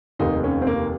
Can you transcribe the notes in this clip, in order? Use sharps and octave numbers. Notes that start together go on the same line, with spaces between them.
F1 D#2 D#3 D#4
C#4
C4
A#3